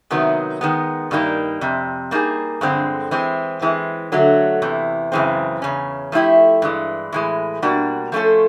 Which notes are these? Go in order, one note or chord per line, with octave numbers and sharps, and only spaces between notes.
C3 D#3 F#3 B3 D#4
D#3 G#3 B3
G2 D#3 G3 A#3 D#4
F2 C3
G3 A#3 D#4 G#4
G2 D3 F3 G#3 C4
E3 G#3 C4
E3 G#3 C4
D3 F#3 A3
E2 C3 E3
F#2 C#3 E3 G#3 C4
E2 C#3 C#4
F3 A3 C#4 E4 G4
G2 E3 G#3
A2 E3 G#3
B2 G3 A#3 D4 F#4
F3 A3 C#4 F4 A4